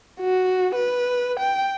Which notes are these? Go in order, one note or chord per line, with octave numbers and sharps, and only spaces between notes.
F#4
B4
G5